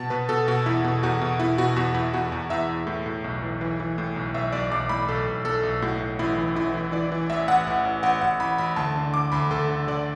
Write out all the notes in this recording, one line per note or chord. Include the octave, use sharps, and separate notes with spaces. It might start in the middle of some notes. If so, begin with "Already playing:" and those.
Already playing: B2 A5
B2 B4
B2 A4
B2 F#4
E2 E4
B2
E2 F#4
B2
B2 E4
B2 F#4
E2 F#4
E2 E4
E2 F#4
E2
E2 E5
E2
A2
A2
B1
E3
E3
E3
A2
B1
B1 E5
B1 D5
B1 D6
A2 B5
B1 A4
B1
B1 A4
B1
A2 F#4
A2
A1 E4
E3
A1 E4
E3
E3 D5
E3
A1 E5
A1 F#5
A1
A1
A1 F#5
A1 F#5
A1 B5
A1 B5
D2 A5
D3
D3 D6
D2 B5
D2 A4
D3
D3 D5